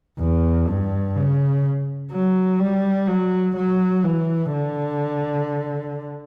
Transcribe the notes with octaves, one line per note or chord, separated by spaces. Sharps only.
E2
G2
C#3
F#3
G3
F#3
F#3
E3
D3